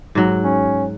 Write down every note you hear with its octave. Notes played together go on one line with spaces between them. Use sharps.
G#2 F#3
C#4